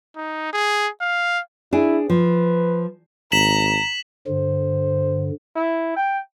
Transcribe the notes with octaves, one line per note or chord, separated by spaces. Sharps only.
D#4
G#4
F5
D4 E4 G#4
F3 B4
G#1 A#5 B6 E7 F#7
G2 D3 C5
E4
G5